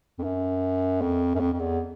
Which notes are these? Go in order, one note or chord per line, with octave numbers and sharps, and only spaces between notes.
F2
F#2
F2
F#2
F2
F2
E2